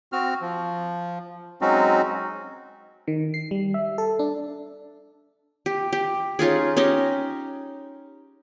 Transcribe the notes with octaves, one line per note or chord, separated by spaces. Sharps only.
C4 F#4 F6
F3
F#3 G#3 C4 C#4 D#4 F#4
D#3
C7
G3
E5
A4
D4
G4
G4
C#4 D#4 F4 G#4
C#4 D#4 G4 D#5